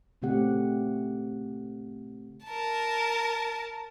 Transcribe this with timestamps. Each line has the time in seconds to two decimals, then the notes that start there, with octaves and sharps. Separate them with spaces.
0.22 A#2 C#3 A3 C4 G4 F#5
2.45 A#4 A5